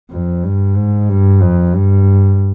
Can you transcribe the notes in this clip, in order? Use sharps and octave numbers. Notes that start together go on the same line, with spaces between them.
F2
G2
G#2
G2
F2
G2